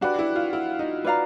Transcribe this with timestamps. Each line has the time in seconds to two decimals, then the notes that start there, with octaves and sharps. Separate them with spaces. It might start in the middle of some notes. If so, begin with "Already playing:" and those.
0.01 D4 F#4 G4 B4 D5
0.19 E4
0.36 F4
0.53 E4
0.79 D#4
1.05 B4 D5 F5 A#5